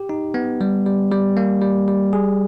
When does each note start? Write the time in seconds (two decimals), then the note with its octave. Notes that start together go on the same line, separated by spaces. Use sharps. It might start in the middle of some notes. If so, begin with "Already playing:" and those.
Already playing: G4
0.09 D#4
0.34 B3
0.61 G3
0.86 G3
1.11 G3
1.37 A#3
1.62 G3
1.88 G3
2.13 G#4